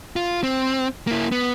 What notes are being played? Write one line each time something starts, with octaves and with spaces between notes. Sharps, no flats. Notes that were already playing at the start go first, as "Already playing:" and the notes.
F4
C4
A#3 E4
B3